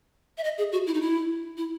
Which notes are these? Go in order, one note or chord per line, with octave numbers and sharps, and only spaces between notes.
E5
D#5
G#4
F#4
E4
D#4
E4
E4